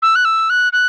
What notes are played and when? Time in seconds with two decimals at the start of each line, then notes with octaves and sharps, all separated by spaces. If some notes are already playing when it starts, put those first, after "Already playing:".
0.02 E6
0.15 F#6
0.25 E6
0.50 F#6
0.73 F#6